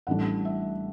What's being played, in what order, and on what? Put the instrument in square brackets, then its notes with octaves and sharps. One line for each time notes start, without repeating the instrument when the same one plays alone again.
[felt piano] A1 A2 E3 G3 D4 F#5
E5